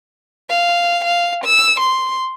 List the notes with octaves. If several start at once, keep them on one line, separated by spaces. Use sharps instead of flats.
F5
F5
E6
C6